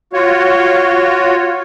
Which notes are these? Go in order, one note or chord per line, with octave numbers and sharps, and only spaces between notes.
F4 F#4 C#5